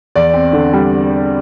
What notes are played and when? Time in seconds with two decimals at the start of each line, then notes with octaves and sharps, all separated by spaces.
0.16 E2 D5
0.34 C4
0.53 D3
0.73 G3